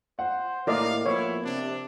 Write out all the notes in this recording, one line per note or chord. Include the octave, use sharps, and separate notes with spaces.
C5 F#5
A2 A#3 A#4 D5 D#5 F5
F3 B3 E4 C#5
C3 D4